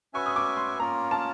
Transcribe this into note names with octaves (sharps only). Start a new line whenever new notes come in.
C#4 F#4 B4 E5 G#5 C#6
D#6
D6
C6
A#3 C#4 F4 A#4 A#5
A5